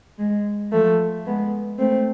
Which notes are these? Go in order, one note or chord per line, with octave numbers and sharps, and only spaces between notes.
G#3
F3 A3
G#3 B3
A3 C4